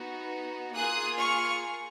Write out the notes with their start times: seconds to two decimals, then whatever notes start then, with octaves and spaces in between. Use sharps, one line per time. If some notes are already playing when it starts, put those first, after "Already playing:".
Already playing: B3 D#4 F#4
0.73 A#3 F4 G#4 D#6 F#6
1.20 C#6 F6